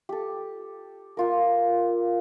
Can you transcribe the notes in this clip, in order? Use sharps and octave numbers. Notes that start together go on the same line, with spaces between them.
G4 A4
A#3 F4 A#4